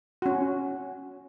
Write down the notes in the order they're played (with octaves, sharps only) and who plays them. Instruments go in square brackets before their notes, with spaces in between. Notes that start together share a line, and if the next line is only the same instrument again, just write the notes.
[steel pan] C#4 F#4